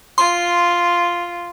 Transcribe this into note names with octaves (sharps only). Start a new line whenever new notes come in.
F4 C6